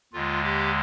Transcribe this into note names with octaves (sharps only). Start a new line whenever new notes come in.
D#2 D3 G#3 F4
G4